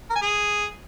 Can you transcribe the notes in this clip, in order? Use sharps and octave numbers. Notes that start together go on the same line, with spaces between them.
A#4
G#5
G#4